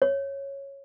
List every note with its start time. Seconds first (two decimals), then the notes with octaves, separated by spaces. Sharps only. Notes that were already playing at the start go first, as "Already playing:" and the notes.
0.02 C#5